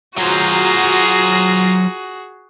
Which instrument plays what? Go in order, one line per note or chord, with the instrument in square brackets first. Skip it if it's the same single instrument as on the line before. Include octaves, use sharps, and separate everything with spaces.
[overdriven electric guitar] F#3 C5 [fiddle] F4 A#5 [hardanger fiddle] F#4 G#4